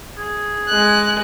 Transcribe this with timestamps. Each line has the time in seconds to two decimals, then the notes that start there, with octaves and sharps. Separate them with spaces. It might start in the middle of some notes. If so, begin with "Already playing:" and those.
0.18 G#4
0.68 G#3 F#6